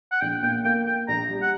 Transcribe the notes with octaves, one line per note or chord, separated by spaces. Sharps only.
F#5
A#1 G5
A#2 G5
A#3 G5
A#3 G5
A#1 A#5
G3
F#5